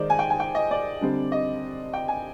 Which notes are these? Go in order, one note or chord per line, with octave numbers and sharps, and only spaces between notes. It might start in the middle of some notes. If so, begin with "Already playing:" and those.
Already playing: D#3 G#3 D#4 C5 D5
G#5
G5
G#5
G5
D#5
D5
D3 G3 C4
D#5
G5
G#5